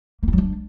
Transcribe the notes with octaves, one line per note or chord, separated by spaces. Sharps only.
A#3
E4
F#3
D4